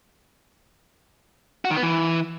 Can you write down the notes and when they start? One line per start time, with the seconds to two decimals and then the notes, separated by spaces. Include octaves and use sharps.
1.65 F#4
1.71 D#3
1.77 B3
1.83 E3